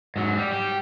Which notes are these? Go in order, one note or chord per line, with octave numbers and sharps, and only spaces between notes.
G#2 F#3
G3
G4